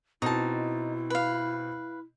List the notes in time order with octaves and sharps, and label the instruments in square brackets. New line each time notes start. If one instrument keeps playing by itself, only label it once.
[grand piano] B2 C4 [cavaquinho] D#4 A5 [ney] E4
[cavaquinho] B4 F5